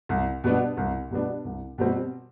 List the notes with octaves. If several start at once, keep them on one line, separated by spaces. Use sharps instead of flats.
C2
B2 G3 B3 D4
C2
B2 G3 B3 D4
C2
B2 G3 C4